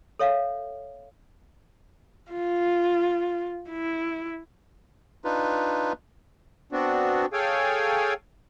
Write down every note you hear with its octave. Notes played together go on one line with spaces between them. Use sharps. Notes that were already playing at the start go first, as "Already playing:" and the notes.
A4 C#5 E5 F5
F4
E4
D4 D#4 F4 B4
B3 C4 D4 F#4
G#4 A4 C#5 F5 G5 G#5